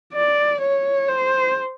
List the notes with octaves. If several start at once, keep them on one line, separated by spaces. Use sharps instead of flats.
D5
C#5
C5